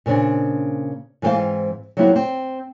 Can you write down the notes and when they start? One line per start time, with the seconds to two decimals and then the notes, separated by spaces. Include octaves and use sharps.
0.06 A#2 C#3 C4 D4
1.22 G#2 E3 B3 C4 C5 F5
1.97 F#3 G3 A#3 C4 E4 F#4
2.16 C4